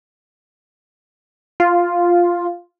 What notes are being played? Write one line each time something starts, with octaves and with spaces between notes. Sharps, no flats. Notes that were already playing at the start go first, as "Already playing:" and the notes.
F4